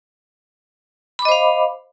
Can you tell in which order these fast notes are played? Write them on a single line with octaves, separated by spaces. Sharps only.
B5 D6 D#5 C5 F5